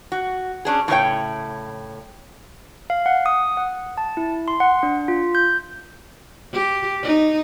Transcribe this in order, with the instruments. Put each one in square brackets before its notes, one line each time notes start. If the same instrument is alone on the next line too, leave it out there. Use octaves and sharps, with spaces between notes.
[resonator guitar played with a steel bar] F#4
C#4 D4 G#4
A2 C#3 E4 G4 C#5 G5
[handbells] F5
F#5
D#6
F#5
A5
E4
C6
F#5
D4
F4
G6
[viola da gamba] G4
D#4